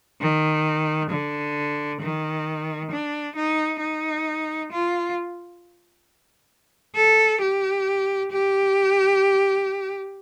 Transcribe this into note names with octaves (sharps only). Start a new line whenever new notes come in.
D#3
D3
D#3
D4
D#4
D#4
F4
A4
G4
G4